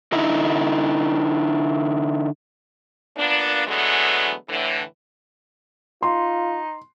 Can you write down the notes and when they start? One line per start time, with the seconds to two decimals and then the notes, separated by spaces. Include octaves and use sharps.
0.12 D3 D#4 E4
3.17 A#2 A#3 B3 D4
3.66 D3 E3 F#3 G#3 A3 B3
4.48 A2 D3 E3
6.03 D#4 F4 C6